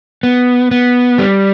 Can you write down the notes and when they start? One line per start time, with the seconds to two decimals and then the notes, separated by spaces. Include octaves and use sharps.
0.23 B3
0.71 B3
1.18 G3